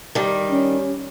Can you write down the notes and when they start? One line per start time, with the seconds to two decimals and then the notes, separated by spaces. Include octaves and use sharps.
0.15 D#3 G3
0.51 C#4